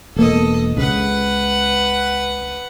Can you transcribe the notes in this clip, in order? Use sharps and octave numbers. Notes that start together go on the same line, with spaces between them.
E1 A#3 B3 A4 D#5
C#2 C#3 B4 F#5